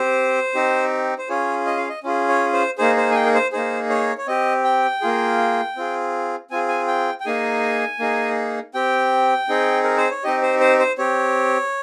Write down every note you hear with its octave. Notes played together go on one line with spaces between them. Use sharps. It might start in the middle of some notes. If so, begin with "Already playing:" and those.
Already playing: C4 G4 C5
C4 D#4 G4
C5
C#4 F4 G#4 C#5
D#5
F5
D#5
C#4 F4 G#4
C#5
C5
A#3 D#4 G#4 C5
C5
G#5
G5
A#4
C5
A#3 D#4 G#4 C5
C#5
C#5
C4 G4 D#5
G5
A#3 F4 G#4
C4 F4 G#4
C4 F4 G#4 G#5
G#5
G5
G5
A#3 D#4 G#4 G#5
A#3 D#4 G#4
C4 G4 G5
C4 D#4 G#4
A#4
C5
C#5
C4 D#4 G4 D#5
C5
C5
C5
C4 G4 C#5